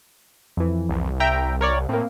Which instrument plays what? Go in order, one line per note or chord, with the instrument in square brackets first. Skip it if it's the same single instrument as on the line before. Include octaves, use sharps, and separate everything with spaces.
[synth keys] F2 E3
[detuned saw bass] C2
[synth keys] E5 G5 A#5
A#4 C#5 D5
[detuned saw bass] A2 [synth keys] A#3 C4